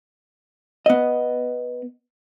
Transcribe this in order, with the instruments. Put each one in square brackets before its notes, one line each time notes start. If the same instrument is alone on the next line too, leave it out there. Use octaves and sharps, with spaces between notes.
[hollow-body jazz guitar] B3 D#5